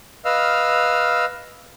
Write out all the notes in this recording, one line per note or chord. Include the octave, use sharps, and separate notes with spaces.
B4 D#5 F5 E6 F6